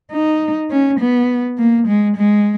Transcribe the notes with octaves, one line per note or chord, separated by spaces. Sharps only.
D#4
C#4
B3
A#3
G#3
G#3